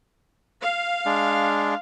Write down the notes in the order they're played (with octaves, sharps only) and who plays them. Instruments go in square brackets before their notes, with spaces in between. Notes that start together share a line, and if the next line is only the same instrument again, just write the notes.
[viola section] F5
[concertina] G#3 D4